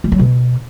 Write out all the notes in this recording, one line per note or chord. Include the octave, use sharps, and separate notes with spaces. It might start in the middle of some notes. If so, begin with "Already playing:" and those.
G3
F#3
B2